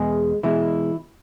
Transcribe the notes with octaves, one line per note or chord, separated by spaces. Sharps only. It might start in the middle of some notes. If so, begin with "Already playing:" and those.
Already playing: E2 B2 G#3 G#4
B2 E3 G#3 E4